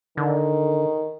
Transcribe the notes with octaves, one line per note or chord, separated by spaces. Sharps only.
D3 D#3